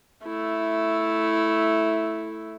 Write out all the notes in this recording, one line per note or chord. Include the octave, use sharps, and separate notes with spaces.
A3 E4